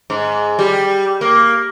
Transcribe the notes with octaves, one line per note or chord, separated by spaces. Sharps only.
G#2
G3
A#3